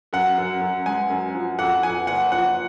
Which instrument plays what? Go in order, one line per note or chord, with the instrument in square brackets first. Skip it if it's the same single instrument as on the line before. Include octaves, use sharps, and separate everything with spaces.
[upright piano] F#2 [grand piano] F#5
[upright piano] F#2
F#2
[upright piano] G#3 [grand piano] G#5
[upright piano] F#2
F3
[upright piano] F2 [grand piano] F#5
[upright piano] F2 [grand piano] G#5
[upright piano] F#1 [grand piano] F#5
[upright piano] F3 [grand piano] F#5